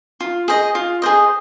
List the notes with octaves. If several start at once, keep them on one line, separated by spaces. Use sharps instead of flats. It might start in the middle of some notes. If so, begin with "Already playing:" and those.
F4
G#4 C5 D#5
F4
G#4 C5 D#5